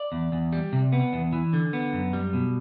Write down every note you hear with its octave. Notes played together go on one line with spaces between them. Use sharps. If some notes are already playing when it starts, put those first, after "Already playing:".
Already playing: D5
E2
E2
G3
C3
B3
E2
E3
D3
B3
F#2
G3
B2